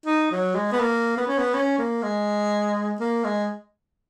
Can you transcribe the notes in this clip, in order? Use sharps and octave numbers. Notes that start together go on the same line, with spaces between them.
D#4
F#3
G#3
B3
A#3
B3
C#4
B3
C#4
A#3
G#3
A#3
G#3